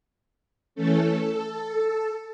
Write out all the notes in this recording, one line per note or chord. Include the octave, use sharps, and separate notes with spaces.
E3 A3 C#4 A4